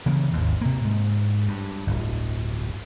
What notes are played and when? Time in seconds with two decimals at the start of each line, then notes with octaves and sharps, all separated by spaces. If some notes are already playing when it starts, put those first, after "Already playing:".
0.06 C#3 E3 A#3
0.33 G#1 D#2
0.61 C3 A#3
0.84 G#2
1.48 G2
1.87 D1 G1